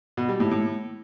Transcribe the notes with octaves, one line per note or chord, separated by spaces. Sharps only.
B2
G3
A2
A2